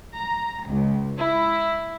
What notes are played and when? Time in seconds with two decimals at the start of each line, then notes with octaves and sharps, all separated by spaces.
0.14 A#5
0.67 C#2
1.19 E4